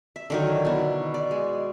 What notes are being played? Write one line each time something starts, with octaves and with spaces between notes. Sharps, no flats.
E5
D3 D#3 F#3
B2 E4
D5
G#3